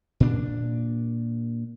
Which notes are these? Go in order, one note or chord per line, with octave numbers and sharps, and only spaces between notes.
A#2 D4